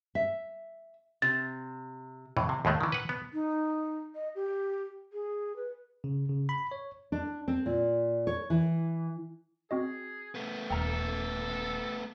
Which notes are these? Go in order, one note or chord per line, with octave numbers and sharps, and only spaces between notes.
E5
C3 A6
F2 A2 E3
C3
D#2 A2 G#3 A3
D#3 E3
B4 F#5
B3
D#4
D#5
G4
G#4
B4
C#3
C#3
B5
C#5
D4
C4
A#2
C#5
E3
C4 F#4 G#4 D#5
A3 B3
D#1 A4 G5 A#5 F6